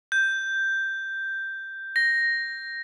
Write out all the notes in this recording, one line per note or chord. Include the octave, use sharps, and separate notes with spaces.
G6
A#6